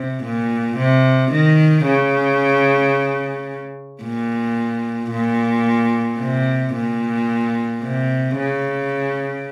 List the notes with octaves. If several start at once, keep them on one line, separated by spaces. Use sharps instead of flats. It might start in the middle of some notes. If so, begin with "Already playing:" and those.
Already playing: C3
A#2
C3
D#3
C#3
A#2
A#2
C3
A#2
C3
C#3